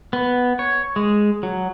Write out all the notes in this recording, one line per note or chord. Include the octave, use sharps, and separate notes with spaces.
B3
C#5
G#3
F#3